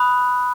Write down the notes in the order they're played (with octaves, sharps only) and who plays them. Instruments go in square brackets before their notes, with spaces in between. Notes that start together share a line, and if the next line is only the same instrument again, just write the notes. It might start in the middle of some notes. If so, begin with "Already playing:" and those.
Already playing: [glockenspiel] B5 D#6 F#6